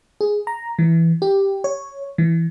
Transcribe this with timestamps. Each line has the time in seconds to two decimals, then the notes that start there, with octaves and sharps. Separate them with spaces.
0.21 G#4
0.47 A#5
0.79 E3
1.22 G4
1.64 C#5
2.18 E3